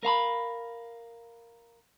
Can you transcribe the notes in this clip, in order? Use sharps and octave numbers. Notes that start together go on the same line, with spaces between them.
A#4 F5 A#5 B5